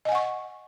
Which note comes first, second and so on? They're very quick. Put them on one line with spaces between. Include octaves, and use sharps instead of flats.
D#5 G#5 F#5 C#6